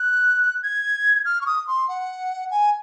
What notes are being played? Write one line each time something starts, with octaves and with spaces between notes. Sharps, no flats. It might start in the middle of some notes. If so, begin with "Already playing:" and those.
Already playing: F#6
G#6
F6
C#6
D#6
C6
F#5
G#5